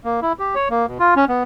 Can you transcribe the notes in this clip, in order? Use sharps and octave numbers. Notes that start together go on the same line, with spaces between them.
A#3
E4
G4
C#5
A#3
B2
F4
C#4
B3